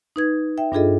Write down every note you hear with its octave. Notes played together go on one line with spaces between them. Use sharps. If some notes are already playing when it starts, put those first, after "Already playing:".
D#4 B4 G#6
E5 G5
G2 D4 F4 G#4 A4 D#5